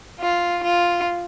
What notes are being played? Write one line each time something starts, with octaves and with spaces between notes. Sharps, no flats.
F4
F4